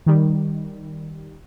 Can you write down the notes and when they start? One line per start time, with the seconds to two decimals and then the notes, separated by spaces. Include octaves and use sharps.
0.06 D#3 G3